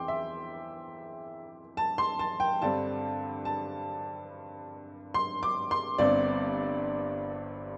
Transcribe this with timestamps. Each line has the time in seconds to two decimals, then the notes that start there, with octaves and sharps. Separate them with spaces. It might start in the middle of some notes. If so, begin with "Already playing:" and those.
Already playing: E2 E3 C4 G5 C6 D6
0.08 E5
1.77 A5
1.98 C6
2.19 A5
2.40 G5
2.62 G2 D3 G3 C4 A5
3.45 A5
5.14 C6
5.43 D6
5.71 C6
5.98 G1 G2 G3 C4 D5